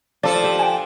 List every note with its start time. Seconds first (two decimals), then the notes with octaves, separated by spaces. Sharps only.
0.23 F3 D4 A4 D5
0.44 G4
0.59 G5 G#5